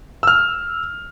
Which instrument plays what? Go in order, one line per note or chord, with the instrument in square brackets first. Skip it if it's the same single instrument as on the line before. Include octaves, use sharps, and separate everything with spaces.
[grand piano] E6 F6